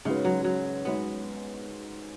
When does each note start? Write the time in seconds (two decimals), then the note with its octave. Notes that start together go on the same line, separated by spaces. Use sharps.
0.05 G#2 C#3 G#3 C#4 F#4 B4
0.25 F#3
0.44 F#3
0.85 G#2 G#3 B3 C#4 F#4 B4